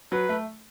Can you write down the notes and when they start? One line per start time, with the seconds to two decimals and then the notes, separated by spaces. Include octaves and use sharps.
0.12 F#3 B4
0.29 A3